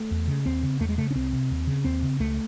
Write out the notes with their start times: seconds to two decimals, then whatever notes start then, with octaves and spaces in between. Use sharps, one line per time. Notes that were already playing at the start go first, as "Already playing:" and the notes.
Already playing: A3
0.11 E2
0.28 C#3
0.46 D#2 C4
0.63 C#3
0.80 E2 A3
0.89 G#3
0.98 C#3 A3
1.11 C#4
1.15 C2 C4
1.33 C3
1.51 D#2
1.67 C#3
1.85 D#2 C4
2.02 C#3
2.20 C#2 A3